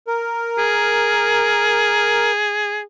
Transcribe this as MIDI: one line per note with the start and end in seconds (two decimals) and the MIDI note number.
0.07 2.32 70
0.58 2.80 68